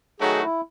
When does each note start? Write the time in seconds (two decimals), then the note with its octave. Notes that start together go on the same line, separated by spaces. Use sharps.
0.20 D#3 F#3 A3 D#4 F#4 G#4
0.42 E4